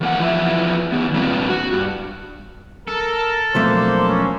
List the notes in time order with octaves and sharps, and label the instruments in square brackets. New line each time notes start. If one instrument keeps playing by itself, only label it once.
[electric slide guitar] E2 A#3 F#5
E2 F3 B4 E5
D#3 B3
A#2 G3 A#3 C4 D4 B4
F#4
G2
[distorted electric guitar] A4 [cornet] A#4
[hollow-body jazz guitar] B1 F2 A3 [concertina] A#3 D4 [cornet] C5
[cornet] C#4